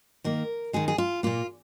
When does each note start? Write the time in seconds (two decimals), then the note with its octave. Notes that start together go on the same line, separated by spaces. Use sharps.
0.24 D#3 A#3 A#4
0.73 D#3 G#3 G#4
0.88 G#4
0.98 F4
1.23 A#2 A#3 F4